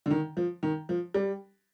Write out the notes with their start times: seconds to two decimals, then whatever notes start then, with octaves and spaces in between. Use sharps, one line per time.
0.06 D3
0.11 D#3
0.37 F3
0.63 D#3
0.89 F3
1.14 G3